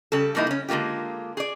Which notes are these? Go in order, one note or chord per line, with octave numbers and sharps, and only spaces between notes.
C#3 G3 A4
F3 G3 A#3 D#4 E4
C#3 C#4
D3 G#3 A#3 F4 G4
G#4 D5